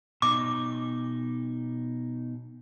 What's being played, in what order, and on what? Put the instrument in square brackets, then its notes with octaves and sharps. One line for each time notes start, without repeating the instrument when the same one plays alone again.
[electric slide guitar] B2 D#4 [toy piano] D6